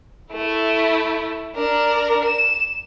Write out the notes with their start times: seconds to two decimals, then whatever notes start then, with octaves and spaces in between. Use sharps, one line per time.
0.32 A3 E4
1.56 D4 A#4
2.24 E7